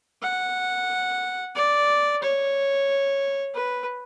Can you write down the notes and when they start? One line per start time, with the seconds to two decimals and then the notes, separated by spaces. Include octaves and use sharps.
0.22 F#5
1.55 D5
2.21 C#5
3.54 B4